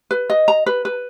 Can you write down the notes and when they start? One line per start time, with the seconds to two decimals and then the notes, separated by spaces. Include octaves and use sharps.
0.11 B4
0.30 D#5
0.48 A#5
0.66 B4
0.85 B4